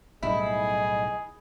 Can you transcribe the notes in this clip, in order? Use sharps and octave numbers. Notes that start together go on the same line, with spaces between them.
B1 A2 G3 E4 G#4 D#5